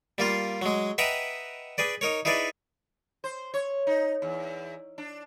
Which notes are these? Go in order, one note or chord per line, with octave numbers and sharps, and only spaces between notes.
G3 A#3 F4
F#3 G#3
B4 D#5 E5 F#5 G5 A#5
G#4 B4 D5
D#4 A#4 C#5
D#4 E4 G#4 B4 D5
C5
C#5
D#4
E2
D4